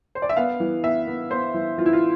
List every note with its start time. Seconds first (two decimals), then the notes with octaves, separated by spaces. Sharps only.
0.15 C5
0.22 D5
0.29 E5
0.36 B3 F5
0.60 E3
0.84 B3 E5
1.07 B3
1.31 B3 C5
1.54 E3
1.78 E3 F4
1.86 E4
1.93 F4